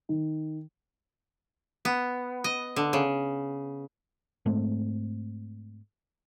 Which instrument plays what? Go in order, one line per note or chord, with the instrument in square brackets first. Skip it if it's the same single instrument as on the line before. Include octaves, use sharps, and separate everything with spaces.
[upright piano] D#3
[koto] B3
D#5
D3
C#3
[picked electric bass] G#2 G#3 A3 C4